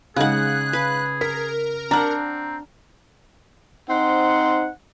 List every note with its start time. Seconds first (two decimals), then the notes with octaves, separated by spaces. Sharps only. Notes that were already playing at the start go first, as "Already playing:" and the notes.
0.16 C#3 G#3 D#4 G#4 F5 F#5 F#6
0.73 B4
1.21 A#4 B6
1.91 C4 D4 F#5 A#5 F6
3.89 C4 D#4 C5 F#5